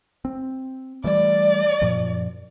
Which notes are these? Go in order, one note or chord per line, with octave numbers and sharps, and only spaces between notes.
C4
E3 G3 A3 D5
F#2 A#2 F3